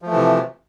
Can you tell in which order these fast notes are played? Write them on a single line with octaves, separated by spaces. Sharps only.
F3 A3 E3 C3